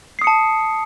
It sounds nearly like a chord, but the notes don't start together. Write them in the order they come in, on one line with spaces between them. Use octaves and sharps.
C7 D#6 C#7 A5